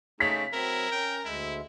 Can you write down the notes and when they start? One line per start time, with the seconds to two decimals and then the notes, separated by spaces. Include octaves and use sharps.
0.20 C#3 A3 C4 D#4 G#4 B6
0.53 F#3 C4 E4 A#4
0.92 C#4 G5
1.25 D2 G#3 E4 E5